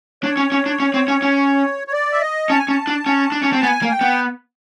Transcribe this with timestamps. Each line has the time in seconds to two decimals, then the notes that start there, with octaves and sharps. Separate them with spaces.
0.23 D4 C#5
0.37 C#4
0.52 C#4
0.66 D4
0.80 C#4
0.94 C4
1.08 C#4
1.22 C#4
1.87 C#5
1.93 D5
2.12 E5
2.21 D#5
2.49 C#4 A5
2.59 G#5
2.68 C#4 A5
2.87 D4
3.06 C#4
3.32 D4
3.43 C#4
3.53 C4
3.63 B3 G#5
3.82 A#3
3.91 G5
4.01 B3